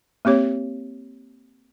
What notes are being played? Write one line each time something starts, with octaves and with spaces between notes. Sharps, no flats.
A#3 C4 G4 C#5